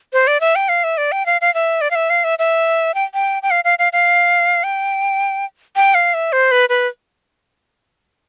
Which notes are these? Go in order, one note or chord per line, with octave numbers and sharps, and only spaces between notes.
C5
D5
E5
G5
F5
E5
D5
G5
F5
F5
E5
D5
F5
E5
F5
E5
E5
G5
G5
G5
F5
F5
F5
F5
G5
G5
F5
E5
C5
B4
B4